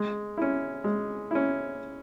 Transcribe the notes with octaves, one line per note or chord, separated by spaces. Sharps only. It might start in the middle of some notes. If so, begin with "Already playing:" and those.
Already playing: G#3
C#4 E4
G#3
C#4 E4